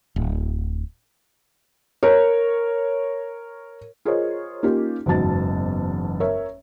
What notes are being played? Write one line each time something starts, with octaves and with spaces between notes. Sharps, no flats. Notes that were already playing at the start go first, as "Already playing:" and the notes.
D1
A#4 C#5
F4 G#4 A#4 C5 C#5 D#5
A#3 C#4 D#4 F4 G4 A#4
F#1 E2 G#2 F#4 A5 A6
A#4 C#5 E5